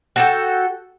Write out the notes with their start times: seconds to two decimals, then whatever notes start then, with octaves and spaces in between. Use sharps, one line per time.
0.16 F#4 A4 G5